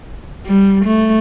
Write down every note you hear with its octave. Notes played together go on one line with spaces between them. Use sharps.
G3
A3